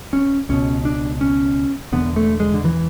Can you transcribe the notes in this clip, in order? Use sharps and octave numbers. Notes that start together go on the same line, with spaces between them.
C#4
C#2 B2 C#4
D4
C#4
E1 E2 D3 B3
A3
G#3
D3
E3